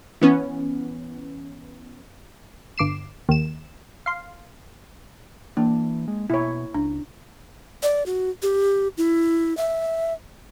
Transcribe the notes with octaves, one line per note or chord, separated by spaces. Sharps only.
E3 B3 C#4
G1 D6 C7 E7
D#2 E7
F5 C6
E3 A#3 D4
G#3
B2 E4 C#5
C#2 D4
D5
F#4
G4
E4
E5